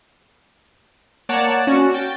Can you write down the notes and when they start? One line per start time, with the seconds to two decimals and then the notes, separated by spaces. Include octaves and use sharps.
1.29 A#3 C#5 D5 F#5 A5 E7
1.67 C#4 F#4
1.94 G5 A6